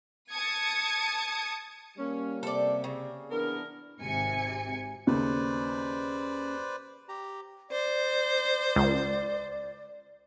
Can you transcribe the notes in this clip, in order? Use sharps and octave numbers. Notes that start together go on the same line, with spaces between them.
A5 D#6 G#6 C#7
G3 A#3 C#4
C3 A4 D5
C#3
E3 B3 D4 A#4
G#1 C3 G#5 C#7
D#2 C#3 B4 C5 D5
G4 A#5
C5 D5
C#2